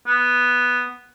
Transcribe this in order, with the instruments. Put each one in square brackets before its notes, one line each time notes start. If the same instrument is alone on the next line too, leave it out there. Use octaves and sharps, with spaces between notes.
[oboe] B3